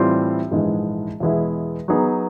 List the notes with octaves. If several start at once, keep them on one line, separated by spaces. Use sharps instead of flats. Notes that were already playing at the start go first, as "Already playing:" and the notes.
Already playing: A2 E3 G3 C4 F4
A#1 G#2 E3 G#3
E2 B2 G#3 B3 E4
F#3 B3 D#4 G#4